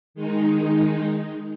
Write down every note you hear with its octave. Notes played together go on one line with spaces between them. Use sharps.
D#3 G#3 D#4